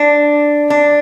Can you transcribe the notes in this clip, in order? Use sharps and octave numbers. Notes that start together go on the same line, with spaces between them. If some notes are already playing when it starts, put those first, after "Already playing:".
Already playing: D4
D4